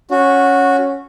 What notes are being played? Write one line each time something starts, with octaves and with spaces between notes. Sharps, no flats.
C#4 F#4